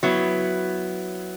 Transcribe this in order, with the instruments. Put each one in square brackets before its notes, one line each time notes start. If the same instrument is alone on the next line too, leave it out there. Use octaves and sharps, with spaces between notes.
[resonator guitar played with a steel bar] F#3 B3 E4